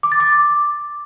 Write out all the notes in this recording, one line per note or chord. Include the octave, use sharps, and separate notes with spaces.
D6
A6
D6